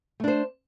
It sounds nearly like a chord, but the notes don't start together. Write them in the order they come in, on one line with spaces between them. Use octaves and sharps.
A3 D4 C5